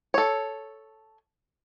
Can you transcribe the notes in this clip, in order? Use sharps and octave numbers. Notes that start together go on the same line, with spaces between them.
A4 C#5